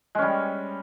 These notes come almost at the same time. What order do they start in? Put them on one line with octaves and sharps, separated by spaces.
G#3 C#4 G3